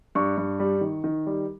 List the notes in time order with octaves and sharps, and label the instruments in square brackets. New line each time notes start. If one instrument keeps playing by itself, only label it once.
[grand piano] G2 C#6
G2
G3
D#3
D#3
G3